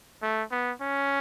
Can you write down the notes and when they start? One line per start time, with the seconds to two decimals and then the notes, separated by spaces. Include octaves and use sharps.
0.22 A3
0.51 B3
0.81 C#4